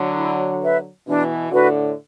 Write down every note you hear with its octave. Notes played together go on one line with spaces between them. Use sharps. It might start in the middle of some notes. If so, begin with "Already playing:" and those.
Already playing: D3 F#3
E4
B4 E5
B2 E3 D4
A2 D3 F#4 B4